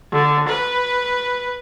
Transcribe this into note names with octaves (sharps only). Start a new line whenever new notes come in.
D3
B4